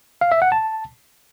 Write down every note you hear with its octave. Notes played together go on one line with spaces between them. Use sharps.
F5
E5
F#5
A5